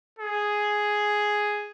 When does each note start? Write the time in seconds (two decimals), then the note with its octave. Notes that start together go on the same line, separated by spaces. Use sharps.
0.19 G#4